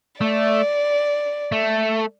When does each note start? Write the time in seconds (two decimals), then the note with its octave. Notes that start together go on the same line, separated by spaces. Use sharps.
0.21 A3 D5
1.52 A3